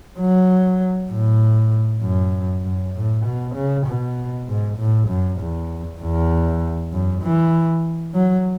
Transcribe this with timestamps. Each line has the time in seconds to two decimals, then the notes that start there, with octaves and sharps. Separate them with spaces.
0.20 F#3
1.10 A2
2.02 F#2
2.64 F#2
2.95 A2
3.25 B2
3.56 C#3
3.87 B2
4.48 G#2
4.78 A2
5.09 F#2
5.40 E2
6.01 E2
6.93 F#2
7.23 E3
8.14 F#3